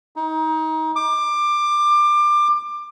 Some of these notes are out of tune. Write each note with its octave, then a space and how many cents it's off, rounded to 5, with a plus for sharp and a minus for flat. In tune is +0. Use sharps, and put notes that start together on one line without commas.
D#4 +25
D6 +20